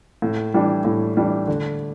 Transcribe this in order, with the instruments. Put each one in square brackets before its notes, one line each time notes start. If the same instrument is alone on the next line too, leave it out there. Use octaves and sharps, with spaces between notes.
[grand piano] A2
E3 G3 D4
A2
E3 G3 D4
D3